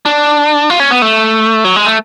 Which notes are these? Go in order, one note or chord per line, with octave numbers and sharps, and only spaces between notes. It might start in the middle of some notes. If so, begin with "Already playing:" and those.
D4
F4
C#4
B3
A3
F#3
G#3
A3